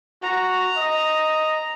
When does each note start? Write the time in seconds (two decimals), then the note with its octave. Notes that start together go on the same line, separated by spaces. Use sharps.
0.22 F#4 A#5
0.77 D#5